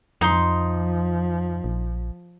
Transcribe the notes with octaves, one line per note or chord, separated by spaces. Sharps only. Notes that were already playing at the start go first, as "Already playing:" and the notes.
F2 F3 D#4 C6
A#1